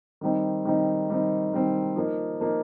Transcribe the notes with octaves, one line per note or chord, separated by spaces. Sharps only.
D#3 G3 C4 D#4
D#3 G3 C4 D#4
D#3 G3 C4 D#4
D#3 G3 C4 D#4
F3 A#3 D#4
F3 A#3 D#4